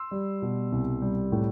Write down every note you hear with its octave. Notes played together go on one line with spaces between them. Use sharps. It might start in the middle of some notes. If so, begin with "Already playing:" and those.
Already playing: C6 E6
G3
B2
C2
G3
A2